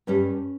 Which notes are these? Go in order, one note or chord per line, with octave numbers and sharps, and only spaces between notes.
G2 G3 C#4